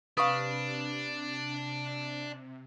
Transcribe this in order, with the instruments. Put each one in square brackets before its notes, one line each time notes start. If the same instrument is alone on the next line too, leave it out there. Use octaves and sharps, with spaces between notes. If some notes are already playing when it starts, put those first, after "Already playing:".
[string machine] C3 [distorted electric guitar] D4 [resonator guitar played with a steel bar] B4 F5 [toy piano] C#6 D#6